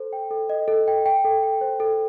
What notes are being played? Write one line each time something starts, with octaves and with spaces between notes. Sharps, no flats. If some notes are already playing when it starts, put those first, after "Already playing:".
Already playing: A4 C5
G5
A4
D#5
A4
G5
G5
A4
G5
C5
A4